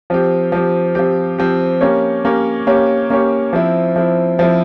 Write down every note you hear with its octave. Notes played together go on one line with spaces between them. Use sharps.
F3 C4 G4
F3 C4 G4
F3 C4 G4
F3 C4 G4
A#3 C#4 G4 C#5
A#3 C#4 G4 C#5
A#3 C#4 G4 C#5
A#3 C#4 G4 C#5
F3 C4 E4
F3 C4 E4
F3 C4 E4